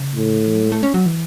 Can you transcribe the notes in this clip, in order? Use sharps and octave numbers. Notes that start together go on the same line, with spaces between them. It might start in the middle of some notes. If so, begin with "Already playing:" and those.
Already playing: C#3
A2
D3
E3
F#3
G#3
A3
C#4
F#3
E3